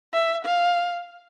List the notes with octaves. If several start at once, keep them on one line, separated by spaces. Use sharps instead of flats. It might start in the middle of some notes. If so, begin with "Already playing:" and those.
E5
F5